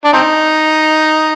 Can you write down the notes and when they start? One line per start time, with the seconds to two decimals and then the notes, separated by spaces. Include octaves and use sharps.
0.05 D4
0.13 C4 D#4